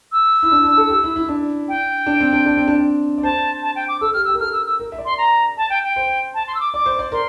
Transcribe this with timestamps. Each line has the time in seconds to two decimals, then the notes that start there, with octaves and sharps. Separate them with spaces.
0.12 E6
0.43 E4
0.52 D4
0.64 D4
0.77 A4
0.90 G4
1.04 E4
1.16 E4
1.29 D4
1.69 G5
2.06 D4
2.20 C4
2.33 D4
2.46 D4
2.57 C4
2.68 D4
3.18 D5
3.23 C5 A5
3.62 A5
3.76 G5
3.88 D6
4.01 A4 E6
4.13 G4 F6
4.25 G4 E6
4.34 A#4
4.40 A4 F6
4.53 E6
4.66 E6
4.80 A#4
4.92 E5
4.98 D5
5.05 C6
5.18 A#5
5.57 A5
5.70 G5
5.83 G5
5.96 C5
6.34 A5
6.47 C6
6.55 E6
6.60 D6
6.73 D5 D6
6.86 C5
6.99 D5
7.12 A#4 C6